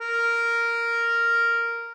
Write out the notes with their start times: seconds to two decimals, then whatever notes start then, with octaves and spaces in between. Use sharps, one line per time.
0.01 A#4